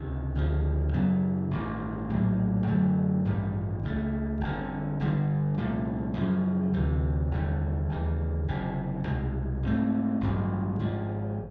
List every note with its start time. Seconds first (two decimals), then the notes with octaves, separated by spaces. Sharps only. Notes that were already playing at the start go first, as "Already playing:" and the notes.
Already playing: C#2 C3 D#3
0.35 D2 C#3 F3
0.93 F#2 C#3 F#3 B3
1.51 A1 G2 D#3
2.10 A#1 A2 F#3 A#3
2.67 F#2 D3 F#3 A3
3.25 A1 G2 D#3 G3
3.83 C#2 C#3 F#3 A3
4.41 G1 F2 D3
5.00 G1 G2 D3 G3
5.57 C2 A#2 F3 A3
6.15 F#2 C#3 F3
6.73 D2 C3 E3
7.31 F1 D#2 D3 G3
7.89 D#2 C#3 E3
8.48 F#1 F2 C3
9.05 C2 B2 G#3
9.63 G#2 F3 A3 C4
10.21 A1 G2 D#3 F#3
10.79 G#1 G#2 F3